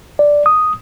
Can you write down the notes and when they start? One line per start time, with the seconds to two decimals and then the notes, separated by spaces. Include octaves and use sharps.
0.19 D5
0.46 D#6